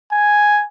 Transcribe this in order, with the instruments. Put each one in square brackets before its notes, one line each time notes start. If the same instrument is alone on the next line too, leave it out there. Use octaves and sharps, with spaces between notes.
[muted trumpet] G#5